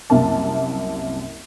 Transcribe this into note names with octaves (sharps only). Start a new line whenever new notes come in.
C2 F#2 C3 A#3 A5